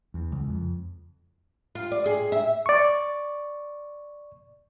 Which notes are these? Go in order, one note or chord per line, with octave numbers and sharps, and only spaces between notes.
E2
C#2
F2
F4
D5
G#4
E5
D5 C#6